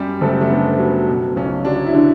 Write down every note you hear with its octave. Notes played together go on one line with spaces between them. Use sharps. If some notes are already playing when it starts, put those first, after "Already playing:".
Already playing: F#2 G3 G4
F#1 A3 A4
A3
D3 B3
F#3
B2
B1 C#3 C#4
D3 F#3 D4
E4
D3 D4